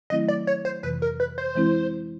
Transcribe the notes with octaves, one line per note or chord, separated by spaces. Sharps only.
D#3 F#3 A3 C4 E4 D#5
D5
C#5
C5
F2 C3 E3 B4
A#4
B4
C5
E3 G#3 C4 E4